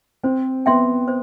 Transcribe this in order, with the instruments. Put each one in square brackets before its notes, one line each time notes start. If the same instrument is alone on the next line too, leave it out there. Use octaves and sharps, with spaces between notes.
[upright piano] C4 [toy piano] C5
[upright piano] B3 [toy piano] E5 G5 C6
[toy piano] C5